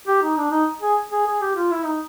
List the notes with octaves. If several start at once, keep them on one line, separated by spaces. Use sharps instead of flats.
G4
D#4
D4
D#4
G#4
G#4
G#4
G4
F4
E4
D#4